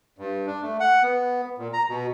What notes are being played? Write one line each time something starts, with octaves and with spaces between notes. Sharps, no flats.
G2
D4
A3
F#5
B3
A#2
A#5
B2